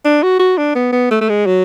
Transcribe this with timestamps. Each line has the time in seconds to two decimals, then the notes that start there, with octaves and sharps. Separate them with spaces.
0.05 D4
0.23 F#4
0.39 F#4
0.57 D4
0.75 B3
0.92 B3
1.11 A3
1.21 A3
1.29 G#3
1.46 F#3